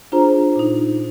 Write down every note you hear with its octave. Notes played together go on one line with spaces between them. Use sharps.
D4 F4 G#4 C5 A#5
A#2 D#4